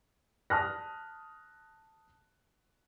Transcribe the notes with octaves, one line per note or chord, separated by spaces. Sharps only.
A5 D#6 F6 F#6 A#6